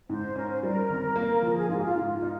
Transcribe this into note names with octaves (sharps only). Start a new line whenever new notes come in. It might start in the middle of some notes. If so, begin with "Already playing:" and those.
G#2 C5
C#4 A#4
C5
G3 A#4
G#1
A#3
F3 A#4
G#4
G#2 F4
G4
F4
G#2
F4
D#4